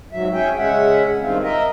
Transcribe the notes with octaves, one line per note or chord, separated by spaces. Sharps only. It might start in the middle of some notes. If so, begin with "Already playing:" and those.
G#2 F#3 E5
C#4 G#4 E5 G5
C#3 G#3 C#4 E5 F#5
G2 D#3 C4 F4
A#4 D#5 E5